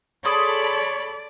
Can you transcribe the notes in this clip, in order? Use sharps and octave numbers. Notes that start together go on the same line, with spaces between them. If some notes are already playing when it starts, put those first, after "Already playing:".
G#4 A4 C#5 D5 B5 C6 D6